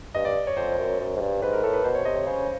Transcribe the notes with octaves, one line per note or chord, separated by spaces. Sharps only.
G2 D#5
D5
C#5
F2 C5
F#2
F#2
G#2
G2
G#2 B4
A#4
A2 A4
B4
B2 C5
C#5
C3 D#5
C#5
C#3 C5